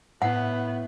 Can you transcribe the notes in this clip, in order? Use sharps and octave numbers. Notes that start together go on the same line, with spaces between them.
A2 B3 F#5